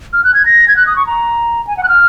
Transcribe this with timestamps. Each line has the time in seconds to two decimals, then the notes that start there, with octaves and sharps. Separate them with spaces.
0.13 F6
0.24 F#6
0.34 G#6
0.46 A#6
0.68 G#6
0.76 F#6
0.87 D#6
0.96 C#6
1.07 A#5
1.67 G#5
1.77 F#5
1.83 F#6
1.88 F6